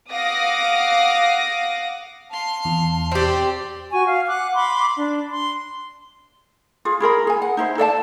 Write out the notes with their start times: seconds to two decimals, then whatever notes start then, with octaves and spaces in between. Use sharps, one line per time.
0.12 F5 F#5 D6 D#6 A#6
2.31 F5 A5 C6
2.65 E2
3.12 C4 G4 C5 D5
3.91 F#4 G#5 C#6
4.04 F5
4.27 F#5 D6 F#6
4.53 B5 C6 D6
4.95 D4
5.30 C6
6.85 F4 G#4
7.00 E4 G#4 A#4 B5
7.27 G#4 G#5
7.42 F#5
7.57 D#4 E4 C5
7.78 A4 D5 E5 A5